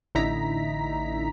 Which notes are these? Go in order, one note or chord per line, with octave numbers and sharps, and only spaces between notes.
A1 D3 D#4 E4 A#5 B6